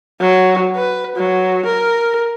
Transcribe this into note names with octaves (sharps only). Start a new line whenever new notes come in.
F#3
B4
F#3
A#4